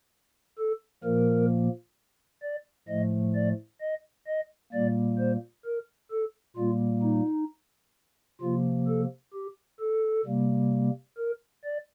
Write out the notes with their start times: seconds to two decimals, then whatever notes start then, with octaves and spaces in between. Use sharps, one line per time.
0.58 A4
1.04 A#2 F3 A#3 A#4
2.42 D5
2.88 A2 F3 A3 D#5
3.35 D5
3.80 D#5
4.26 D#5
4.72 A#2 G3 A#3 D5
5.18 C5
5.65 A#4
6.11 A4
6.56 A#2 G3 A#3 F4
7.03 D#4
8.41 C3 F3 A#3 F4
8.87 A4
9.34 G4
9.79 A4
10.25 C3 G3 A#3
11.18 A#4
11.63 D5